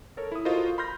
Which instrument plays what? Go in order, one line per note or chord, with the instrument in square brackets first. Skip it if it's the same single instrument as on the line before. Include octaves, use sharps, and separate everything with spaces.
[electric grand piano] A4 A#4 C#5
E4 D#6
F4 F#4 A4 A#4 C5 D#5
B5 C6 F6 G6 A#6